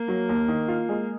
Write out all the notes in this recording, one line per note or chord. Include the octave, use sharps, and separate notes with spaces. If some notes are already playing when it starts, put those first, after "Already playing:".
Already playing: A#3
F#3
D#2
D#3
F4
G#3